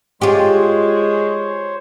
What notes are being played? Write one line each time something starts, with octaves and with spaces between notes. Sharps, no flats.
G#3 F4 G4 C5 C#5